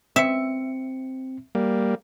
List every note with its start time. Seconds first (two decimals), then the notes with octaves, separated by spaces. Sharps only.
0.16 C4 E5 C#7
1.55 G3 A#3